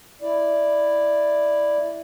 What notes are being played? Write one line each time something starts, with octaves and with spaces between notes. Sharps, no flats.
E4 D5